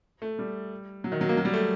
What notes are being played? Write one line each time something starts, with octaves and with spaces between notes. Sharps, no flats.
A3
G3
F#3
D#3
F#3
A#3
F#3
G3
A3